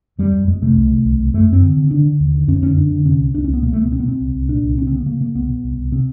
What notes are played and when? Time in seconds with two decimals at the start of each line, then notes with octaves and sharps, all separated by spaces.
0.18 F2 G3
0.33 F2
0.48 F2 G#3
0.62 C3 A3
0.76 C2
0.91 C3
1.05 C2
1.19 C2
1.34 F#2 A3
1.48 F#2 C4
1.62 D3
1.77 D3
1.91 D3 D4
2.05 D3
2.20 D#2
2.34 D3
2.48 F2 C#4
2.63 D3 C#4
2.77 F2 D4
2.92 D3
3.05 C3 C#4
3.20 C#2
3.34 C#2 D4
3.44 C#4
3.49 C#2 B3
3.63 B2 A#3
3.73 A3
3.77 C#2
3.82 B3
3.91 B2 C4
4.00 B3
4.06 B2 C4
4.20 C2
4.35 C2
4.49 A#2 D4
4.63 C2
4.78 C#3 C#4
4.87 C4
4.92 C#3 B3
5.06 C#3 A#3
5.20 C#3 A#3
5.35 C2 B3
5.49 B2
5.63 C2
5.78 C2
5.92 C3 C4